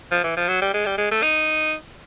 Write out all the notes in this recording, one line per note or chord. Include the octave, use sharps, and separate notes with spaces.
F3
E3
F3
F#3
G3
G#3
G3
G#3
A3
D#4